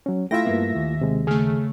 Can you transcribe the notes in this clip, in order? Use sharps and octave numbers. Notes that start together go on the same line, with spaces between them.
F#3 C#4
A3 E4 F4 E5 G5 A#6
G2 A#3 B3
D#2
C3 G#3
C#3 A3 G#4 F6